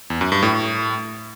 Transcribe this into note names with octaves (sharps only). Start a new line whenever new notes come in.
E2
F#2
G2
A2